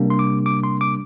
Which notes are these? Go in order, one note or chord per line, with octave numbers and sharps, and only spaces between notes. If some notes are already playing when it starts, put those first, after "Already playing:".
Already playing: C3 G3 A#3 D4
C6
D6
D6
C6
D6